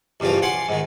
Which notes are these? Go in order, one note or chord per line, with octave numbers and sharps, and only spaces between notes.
A1 G2 C#3 F3 F4
F#5 G#5 C6 D6
G#2 D#3